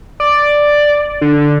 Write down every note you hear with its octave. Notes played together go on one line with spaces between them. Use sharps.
D5
D3